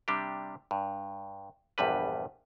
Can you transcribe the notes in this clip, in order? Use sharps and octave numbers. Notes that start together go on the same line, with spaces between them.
C3 G3 D4 G4
G2
A#1 E2 G2 G3 B4